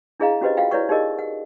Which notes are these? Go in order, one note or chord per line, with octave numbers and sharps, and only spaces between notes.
D4 E4 G#4 D#5 F5 A#5
C#4 F#4 G4 B4 C5 D#5
F4 F#4 D#5 F5 G5
E4 B4 C#5 D5 F#5 C#6
D#4 G4 G#4 A#4 D#5
F#5